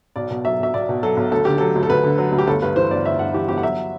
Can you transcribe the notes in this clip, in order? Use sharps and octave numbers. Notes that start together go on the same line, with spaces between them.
B1 D5
B2
F#3 E5
B1 E5
B1 D5
B2
F#3 A4
B1
D2 A4
D3 G4
F#3 A4
D2
A4
D2 B4
D3
F#3
D2
G4
G1 A4
G2 B4
E3 C5
G1 D5
G1 E5
G2 F#5
E3 G4
G1 G4
F#5
F#3 E5